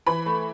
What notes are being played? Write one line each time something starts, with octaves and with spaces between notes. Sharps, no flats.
E3 B5
A3